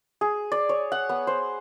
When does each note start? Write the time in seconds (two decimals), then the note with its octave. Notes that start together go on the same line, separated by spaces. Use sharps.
0.21 G#4
0.52 D5
0.69 C#5
0.92 F#5
1.09 B3
1.27 C5